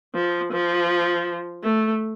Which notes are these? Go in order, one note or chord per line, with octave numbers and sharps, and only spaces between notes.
F3
F3
A3